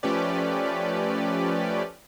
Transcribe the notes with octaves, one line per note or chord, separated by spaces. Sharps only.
F3 A3 C#4 G4 B4 D5